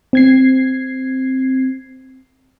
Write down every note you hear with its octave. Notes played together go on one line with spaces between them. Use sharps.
C4 G#6 C7